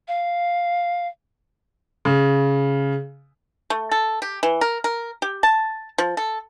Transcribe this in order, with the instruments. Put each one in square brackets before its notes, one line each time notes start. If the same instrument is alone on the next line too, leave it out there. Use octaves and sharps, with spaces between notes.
[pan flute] F5
[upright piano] C#3
[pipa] A3
A4
G4
E3
A#4
A#4
G4
A5
F3
A4